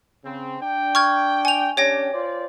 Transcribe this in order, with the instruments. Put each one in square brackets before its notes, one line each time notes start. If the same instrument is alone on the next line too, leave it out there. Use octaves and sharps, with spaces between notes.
[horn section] C#3 C4
D4 G5
[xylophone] C#6 F6 G#6
G#5 F7
[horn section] C#4 D4 G4 [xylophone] C#5 G5 A#6
[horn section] F4 C5 D5